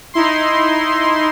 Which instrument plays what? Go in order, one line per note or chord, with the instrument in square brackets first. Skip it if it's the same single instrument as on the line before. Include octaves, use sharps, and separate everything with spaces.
[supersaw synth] D#4 E4 C6